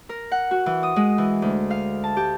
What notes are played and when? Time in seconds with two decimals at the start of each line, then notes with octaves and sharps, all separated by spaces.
0.09 A#4
0.32 F#5
0.51 F#4
0.66 E3
0.83 D#6
0.96 G#3
1.18 E3
1.42 D2
1.71 F5
2.04 A5
2.16 G4